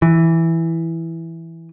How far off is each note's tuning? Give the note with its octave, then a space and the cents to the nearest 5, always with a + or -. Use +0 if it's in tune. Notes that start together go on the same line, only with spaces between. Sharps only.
E3 +0